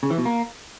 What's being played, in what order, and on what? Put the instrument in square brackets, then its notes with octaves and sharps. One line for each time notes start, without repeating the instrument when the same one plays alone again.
[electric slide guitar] C#3
E3
B2
A#3